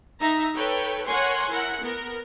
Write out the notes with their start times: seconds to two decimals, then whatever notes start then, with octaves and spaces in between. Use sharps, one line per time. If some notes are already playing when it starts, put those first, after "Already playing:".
0.20 D#4 E5 A#5
0.56 A4 B4 C#5 G5
1.07 A#4 C#5 F#5 G#5 C6
1.52 E4 A#4 F#5
1.83 B3 A#4